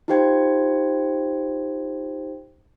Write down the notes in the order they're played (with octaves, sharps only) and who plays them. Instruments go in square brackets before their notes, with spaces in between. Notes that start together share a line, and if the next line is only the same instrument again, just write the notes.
[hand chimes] D#4 F4 G4 C5 G5 G#6